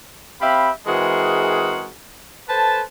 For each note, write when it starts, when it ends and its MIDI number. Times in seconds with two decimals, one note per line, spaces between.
0.41 0.69 60
0.41 0.69 67
0.41 0.69 76
0.41 0.69 77
0.41 0.69 83
0.86 1.90 52
0.86 1.90 56
0.86 1.90 60
0.86 1.90 66
0.86 1.90 68
0.86 1.90 70
2.49 2.81 69
2.49 2.81 71
2.49 2.81 72
2.49 2.81 81